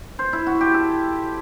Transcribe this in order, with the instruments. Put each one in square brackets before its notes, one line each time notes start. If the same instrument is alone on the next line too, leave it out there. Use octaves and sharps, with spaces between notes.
[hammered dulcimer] C5
E4
F#4
G4
A4